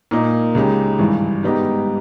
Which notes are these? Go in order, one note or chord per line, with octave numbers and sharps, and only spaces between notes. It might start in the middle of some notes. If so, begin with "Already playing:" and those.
A#2 A#3 D#4
C#2 C#3 G#3 D#4 G4
G#1 G2 E3
G#2 G3 B3 D#4 G4